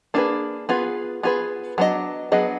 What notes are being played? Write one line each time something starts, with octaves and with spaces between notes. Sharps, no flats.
A#3 D4 F4 G#4 B4
B3 F4 G#4 B4
B3 F4 G#4 B4
F#3 B3 D4 G#4 D#5
F#3 B3 D4 G#4 D#5